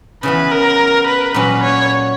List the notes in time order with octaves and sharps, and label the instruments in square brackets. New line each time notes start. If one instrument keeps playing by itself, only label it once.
[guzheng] C#3 E3 B3 [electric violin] B4
[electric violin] A#4
B4
[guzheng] A#2 F#3 A#3 C#4 [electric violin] B4
[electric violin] C#5